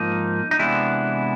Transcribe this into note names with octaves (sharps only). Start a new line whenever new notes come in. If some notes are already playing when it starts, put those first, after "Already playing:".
Already playing: G#2 F3 A#3 D#4
D#4
C3 E3 G#3 B3 D4 E4